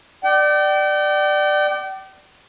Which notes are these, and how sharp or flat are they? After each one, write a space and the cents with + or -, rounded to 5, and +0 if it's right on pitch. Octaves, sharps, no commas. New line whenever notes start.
D5 +15 G5 -35